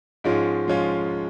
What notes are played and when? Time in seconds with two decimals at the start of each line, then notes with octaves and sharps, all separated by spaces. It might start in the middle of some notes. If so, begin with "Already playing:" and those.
0.24 G#2 F3 G#3 C#4 F4
0.68 F3 G#3 C#4 F4